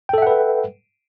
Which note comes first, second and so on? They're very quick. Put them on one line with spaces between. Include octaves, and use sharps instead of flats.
G5 A4 E5 F#5 B4